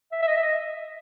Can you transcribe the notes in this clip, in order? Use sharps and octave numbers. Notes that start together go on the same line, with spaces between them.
E5
E5
D#5
E5
D#5